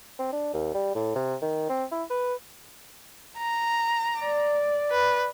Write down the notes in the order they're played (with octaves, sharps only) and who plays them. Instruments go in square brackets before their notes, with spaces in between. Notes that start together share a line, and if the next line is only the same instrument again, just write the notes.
[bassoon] C4
D4
D#2
G3
A2
C3
D#3
C4
E4
B4
[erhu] A#5
[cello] D5
[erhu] B4